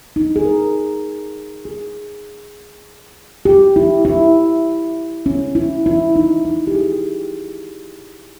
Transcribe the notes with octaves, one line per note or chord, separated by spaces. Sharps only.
D#4
G#4
A#4
G#4
G4
E4
E4
C#4
E4
E4
D#4
E4
G4
G#4